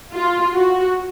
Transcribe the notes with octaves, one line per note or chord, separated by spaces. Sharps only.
F4
F#4